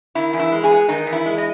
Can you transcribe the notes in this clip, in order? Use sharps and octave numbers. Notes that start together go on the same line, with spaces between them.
D#3 E4
E2
E4
G#3
G#4
B3
D#3 D#4
E2
E4
G#3
D#5